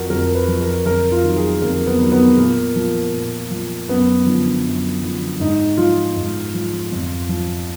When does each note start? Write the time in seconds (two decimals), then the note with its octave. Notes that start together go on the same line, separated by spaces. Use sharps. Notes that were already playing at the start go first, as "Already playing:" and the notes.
Already playing: F2 F3 F#4 A#4
0.10 F2 A#4
0.35 B4
0.48 F3
0.61 A#4
0.86 F2 A#4
1.11 F4
1.24 D#3 F#3
1.36 G#4
1.62 F2 A#3
1.87 B3
2.00 D#3 F#3
2.12 B3
2.37 A#2 A#3
2.76 F3
3.13 A#2
3.51 F3
3.89 F#2 B3
4.26 D3 F3
4.65 F#2
5.03 D3 F3
5.40 G#2 D#4
5.77 F3 F4
6.16 G#2
6.54 F3
6.92 F2
7.29 F3